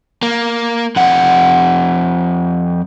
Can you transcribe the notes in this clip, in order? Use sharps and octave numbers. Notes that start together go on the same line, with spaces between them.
A#3
F2 F#5